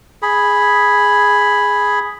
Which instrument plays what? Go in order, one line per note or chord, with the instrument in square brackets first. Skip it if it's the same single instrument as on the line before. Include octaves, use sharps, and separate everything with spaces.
[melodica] G#4 B5